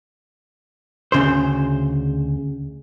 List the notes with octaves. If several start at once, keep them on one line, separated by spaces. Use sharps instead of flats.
D2 C#3 C5